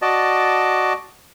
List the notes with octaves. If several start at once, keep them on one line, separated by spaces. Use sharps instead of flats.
F#4 D5 D#5 A5